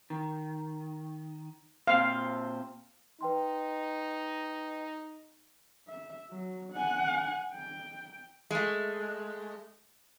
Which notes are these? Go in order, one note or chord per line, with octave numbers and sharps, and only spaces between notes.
D#3
A#2 C4 C5 F5
D#4 B4 G5 C6
E5
F#3
F#5 G#5
G5
G#3 A3